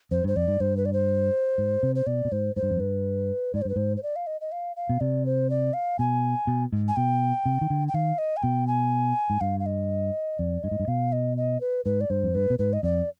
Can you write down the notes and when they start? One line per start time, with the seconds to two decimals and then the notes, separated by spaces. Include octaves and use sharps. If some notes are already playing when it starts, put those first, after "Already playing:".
0.11 F2 C5
0.24 G2
0.28 C5
0.36 F2 D5
0.48 G2
0.60 G2 C5
0.77 B4
0.86 D5
0.93 C5
1.58 G#2
1.83 C3
1.95 C5
2.07 B2 D5
2.25 B2
2.32 G#2 C5
2.56 G#2 C5
2.63 G2
2.70 F2
2.77 G2 B4
3.54 G#2 D5
3.62 C5
3.65 G2 B4
3.76 G#2 C5
3.97 C5
4.03 D5
4.16 F5
4.27 D#5
4.41 D#5
4.52 F5
4.76 F5
4.89 B2
5.01 C3 D5
5.26 C5
5.50 D5
5.74 F5
5.99 B2 G#5
6.47 B2
6.72 G#2
6.88 G#5
6.96 B2 G5
7.46 C3
7.61 D#3
7.70 D3
7.88 G5
7.94 D#3 F5
8.18 D#5
8.37 G#5
8.43 B2 G5
8.67 G#5
9.30 G#2
9.41 G2 F5
9.60 F5
9.66 D#5
10.39 F2 D5
10.63 G2 D#5
10.71 G#2
10.80 G2
10.88 B2 F5
11.12 D#5
11.37 D#5
11.61 B4
11.85 G#2 B4
12.01 D5
12.10 G2 C5
12.23 F2
12.35 G2 B4
12.50 B2
12.59 G#2 B4
12.73 D#5
12.83 F2 D5